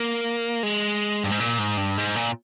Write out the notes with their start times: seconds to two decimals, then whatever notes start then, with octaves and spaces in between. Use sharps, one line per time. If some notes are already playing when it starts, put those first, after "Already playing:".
Already playing: A#3
0.63 G#3
1.24 G2
1.32 G#2
1.40 A#2
1.59 G#2
1.77 G2
1.98 G#2
2.16 A#2